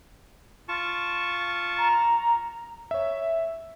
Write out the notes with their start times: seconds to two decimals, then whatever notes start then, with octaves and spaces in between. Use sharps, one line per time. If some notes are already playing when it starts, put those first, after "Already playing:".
0.68 F4 A5 C#6
1.78 A#5
2.91 C#5 E5